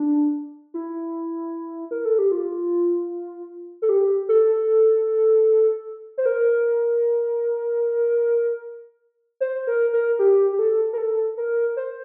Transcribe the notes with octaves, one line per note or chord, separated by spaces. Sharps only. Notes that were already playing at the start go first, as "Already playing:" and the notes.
Already playing: D4
E4
A#4
A4
G4
F4
A4
G4
A4
C5
A#4
C5
A#4
A#4
G4
G4
A4
A#4
A4
A#4
C5